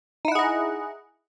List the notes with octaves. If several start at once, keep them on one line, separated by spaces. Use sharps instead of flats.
D#4 E4 G#4 D#5 F#5